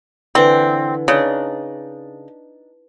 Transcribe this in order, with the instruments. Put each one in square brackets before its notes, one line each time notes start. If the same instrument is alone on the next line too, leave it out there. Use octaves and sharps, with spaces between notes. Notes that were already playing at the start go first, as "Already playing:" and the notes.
[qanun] D3 E3 D4 [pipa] C4
[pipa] C#3 [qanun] D4 D#4